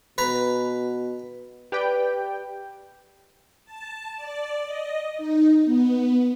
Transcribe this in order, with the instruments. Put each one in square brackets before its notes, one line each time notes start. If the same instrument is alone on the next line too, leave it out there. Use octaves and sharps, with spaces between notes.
[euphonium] B2 [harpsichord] B4 A#5
[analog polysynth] G4 B4 D5 G5
[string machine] A5
D5
D#5
D#4
B3